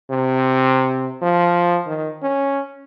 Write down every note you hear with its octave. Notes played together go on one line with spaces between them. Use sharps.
C3
F3
D#3
C#4